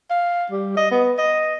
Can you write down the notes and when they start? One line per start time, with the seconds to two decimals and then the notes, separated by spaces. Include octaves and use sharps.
0.10 F5
0.51 G3
0.77 D#5
0.91 B3
1.18 D#5